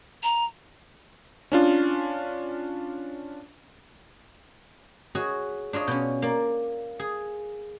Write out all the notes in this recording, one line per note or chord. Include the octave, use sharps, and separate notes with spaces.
A#5
C#4 D4 F4
F#4 G#4 C#5 D#5
D4 F4 C#5 D#5
B2 C#4
A#3 D5
G#4